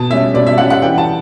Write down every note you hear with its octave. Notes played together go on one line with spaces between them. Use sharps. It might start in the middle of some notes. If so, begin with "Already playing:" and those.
Already playing: B2 A5
G3 C#4 E5
B2 D5
E5
G3 C#4 F#5
F#5
E3 G5
A5